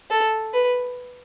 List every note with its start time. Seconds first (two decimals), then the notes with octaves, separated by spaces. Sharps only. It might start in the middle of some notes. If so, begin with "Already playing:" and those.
0.10 A4
0.54 B4